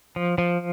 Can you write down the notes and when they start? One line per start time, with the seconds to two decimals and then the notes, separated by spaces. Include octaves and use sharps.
0.16 F3
0.38 F3